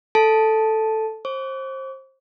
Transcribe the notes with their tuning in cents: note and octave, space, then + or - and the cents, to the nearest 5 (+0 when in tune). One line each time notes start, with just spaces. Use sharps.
A4 +0 A5 -5
C5 +25 D6 -45